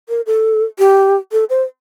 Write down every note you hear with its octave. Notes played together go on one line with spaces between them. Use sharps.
A#4
A4
G4
A4
C5